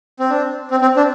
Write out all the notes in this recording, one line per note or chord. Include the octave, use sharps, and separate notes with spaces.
C4
D4
C4
C4
D4